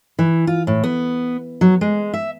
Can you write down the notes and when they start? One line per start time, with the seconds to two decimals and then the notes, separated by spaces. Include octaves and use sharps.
0.19 E3
0.47 F4
0.67 A2
0.84 B3
1.61 F#3
1.81 G#3
2.14 E5